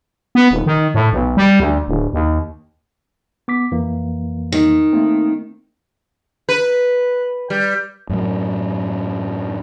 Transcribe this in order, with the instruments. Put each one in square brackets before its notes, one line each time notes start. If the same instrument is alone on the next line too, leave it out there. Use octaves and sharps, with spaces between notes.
[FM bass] B3
D#1
D#3
A2
B1
G3
D2
D1
D#2
[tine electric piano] B3 D6 B6
F2 E3 A#3
[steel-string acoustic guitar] D#3
[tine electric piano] A3 A#3 C4
[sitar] B4
G3
[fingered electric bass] F#2 A2 F#3